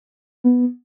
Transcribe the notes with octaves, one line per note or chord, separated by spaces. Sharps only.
B3